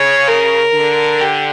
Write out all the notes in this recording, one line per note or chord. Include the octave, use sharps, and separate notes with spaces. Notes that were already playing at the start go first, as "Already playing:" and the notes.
Already playing: C#3 C#5
A#4
D3
G4